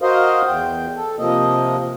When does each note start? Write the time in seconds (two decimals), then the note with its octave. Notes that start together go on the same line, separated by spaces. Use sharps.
0.02 F#4 A#4 C5 D#5 F5
0.47 E2 G5
0.96 A4
1.19 C3 F3 A#3 D#5